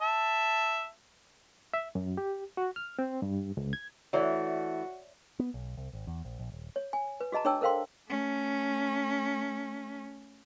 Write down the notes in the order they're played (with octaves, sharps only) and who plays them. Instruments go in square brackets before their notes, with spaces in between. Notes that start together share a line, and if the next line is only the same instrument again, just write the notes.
[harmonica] E5 A5
[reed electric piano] E5
F#2
G4
F#4
F6
C4
G2
C#2
G#6
[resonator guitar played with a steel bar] E3 A3 [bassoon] F#4 [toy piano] C#5 D5 E5
[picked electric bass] B3
B1
C2
G#1
E2
A#1
A#1
D#1
[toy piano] C#5
G#5
B4
F#4 G#4 D#5 A5 A#5
D4 G#4 C#5 G5 A5 E6
A4 A#4 C5 F5 G5 C6
[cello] A3 C#4